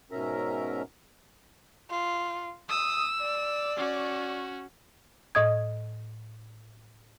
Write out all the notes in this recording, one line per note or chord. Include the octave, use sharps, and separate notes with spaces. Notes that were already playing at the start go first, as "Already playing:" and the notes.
G#2 B2 C#4 A#4 E5 A#5
F4
D#6 E6
D5
C#4 F#4
A2 D#5 D#6 G#6